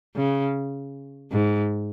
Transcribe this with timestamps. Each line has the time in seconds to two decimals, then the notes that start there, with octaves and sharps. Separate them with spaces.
0.16 C#3
1.32 G#2